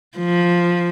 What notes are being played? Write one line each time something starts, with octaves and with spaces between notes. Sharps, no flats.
F3